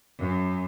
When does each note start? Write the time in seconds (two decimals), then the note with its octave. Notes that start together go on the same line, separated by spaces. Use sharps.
0.18 F#2